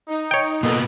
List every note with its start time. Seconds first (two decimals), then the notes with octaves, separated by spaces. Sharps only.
0.08 D#4
0.31 C#5 G5
0.63 A#2 A#3 B3 A4 D#5